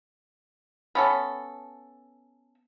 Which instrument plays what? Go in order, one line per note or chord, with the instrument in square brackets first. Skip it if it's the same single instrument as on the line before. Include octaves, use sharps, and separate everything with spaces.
[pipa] B3 C#4 A4